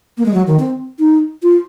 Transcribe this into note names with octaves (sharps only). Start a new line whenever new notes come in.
A#3
G#3
F#3
D#3
C4
D#4
F4